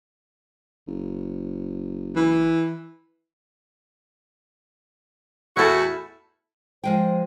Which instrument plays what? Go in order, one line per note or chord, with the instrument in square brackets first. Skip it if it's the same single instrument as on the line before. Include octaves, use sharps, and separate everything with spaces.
[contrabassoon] F#1
[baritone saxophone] E3
[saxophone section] E2 A2 F#4 [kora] E4 A4
[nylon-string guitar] F3 G#3 G5 [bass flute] C5